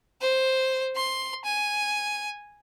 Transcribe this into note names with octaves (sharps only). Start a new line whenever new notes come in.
C5
C6
G#5